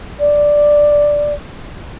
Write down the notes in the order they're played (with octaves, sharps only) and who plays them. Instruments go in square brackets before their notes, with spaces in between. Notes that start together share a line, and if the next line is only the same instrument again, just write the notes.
[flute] D5